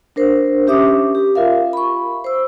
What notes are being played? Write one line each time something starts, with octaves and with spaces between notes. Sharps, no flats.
D4 A#4 C5
C#4 G4 E5 D6 D#6
G4
F4 A#4 E5 F5
B5 C#6
C5 E6